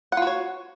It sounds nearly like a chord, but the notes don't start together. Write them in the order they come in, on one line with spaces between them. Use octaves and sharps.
F#5 F4 F#4 C#5